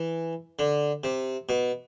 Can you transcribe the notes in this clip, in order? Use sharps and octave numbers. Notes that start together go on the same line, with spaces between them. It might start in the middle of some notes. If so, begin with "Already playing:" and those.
Already playing: E3
D3
C3
B2